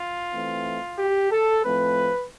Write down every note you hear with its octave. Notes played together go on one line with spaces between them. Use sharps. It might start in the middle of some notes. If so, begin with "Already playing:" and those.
Already playing: F4
E3 A3 C4
G4
A4
A2 F3 A3 C4 B4